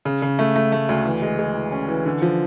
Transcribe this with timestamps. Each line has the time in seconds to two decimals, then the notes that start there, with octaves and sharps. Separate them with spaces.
0.05 C#3
0.22 C#3
0.39 A3
0.56 A3
0.72 A3
0.89 D2
1.05 E3
1.22 G#3
1.39 G#3
1.55 E3
1.72 C#4
1.89 E3
2.05 D3
2.22 F3